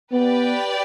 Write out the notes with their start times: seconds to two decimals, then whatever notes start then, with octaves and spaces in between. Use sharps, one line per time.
0.11 B3 G4 B4 D5 G5